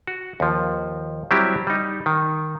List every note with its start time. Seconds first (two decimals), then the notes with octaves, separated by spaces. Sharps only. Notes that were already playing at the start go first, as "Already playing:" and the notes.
0.07 F#4
0.40 D#2 F3
1.31 F#3 G3 C4 E4 G4
1.67 G3 D#4
2.06 D#3